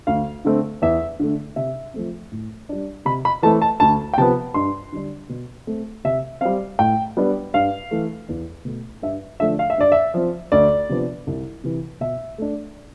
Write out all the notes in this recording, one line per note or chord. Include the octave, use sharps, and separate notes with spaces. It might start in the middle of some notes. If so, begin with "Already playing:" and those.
D2 F5
D3 A3 C4
E2 E5
D3 A3
C3 E5
F3 A3 C4
A2
G3 D4
C3 B5
B5
E3 A3 C4 A5
A5
D2 A5
G5
C3 F3 B3 A5
G2 C6
D3 G3 D4
B2
A3 C4
C3 E5
G3 C4 F5
A2 G5
G3 B3 D4
G2 F5
E3 A3
E2
B2 A3
G2 E5
D3 F3 A3 D4 E5
F5
E5
G2 D5
E5
F3 C4
D2 D5
C3 F3 B3 D4
C2
C3 E3
B2 E5
A3 D4